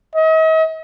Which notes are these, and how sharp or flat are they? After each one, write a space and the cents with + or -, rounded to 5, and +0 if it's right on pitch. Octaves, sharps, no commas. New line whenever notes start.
D#5 +45